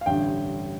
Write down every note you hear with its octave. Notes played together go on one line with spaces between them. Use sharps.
F5
A1 G2 D3 G5